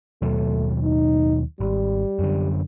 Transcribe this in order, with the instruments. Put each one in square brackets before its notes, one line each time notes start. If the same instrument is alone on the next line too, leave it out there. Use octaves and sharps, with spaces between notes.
[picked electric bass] D#2 B2 F#3 [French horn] A3
[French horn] D#4
[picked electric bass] G#1 [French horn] G3
[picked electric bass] F#2 D3